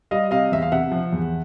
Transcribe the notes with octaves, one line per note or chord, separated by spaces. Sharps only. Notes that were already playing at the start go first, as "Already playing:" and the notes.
G3 D#5 F5
C3 D#5 F5
E2 E5
F5
C3 E5 F#5
F3
E2